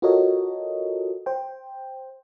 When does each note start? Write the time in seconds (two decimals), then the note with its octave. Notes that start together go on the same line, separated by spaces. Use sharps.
0.02 F4 F#4 A4 A#4 C#5 D#5
1.26 C5 G5